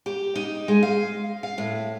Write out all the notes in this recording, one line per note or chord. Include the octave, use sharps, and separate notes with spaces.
G4
D#4
G#3
F5
F5
A2